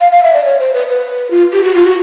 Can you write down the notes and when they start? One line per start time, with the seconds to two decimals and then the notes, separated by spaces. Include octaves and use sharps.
0.01 F5
0.12 F5
0.23 E5
0.33 D5
0.44 C#5
0.59 C5
0.73 B4
0.88 B4
1.31 F4
1.53 G4
1.63 F#4
1.74 F4
1.85 F#4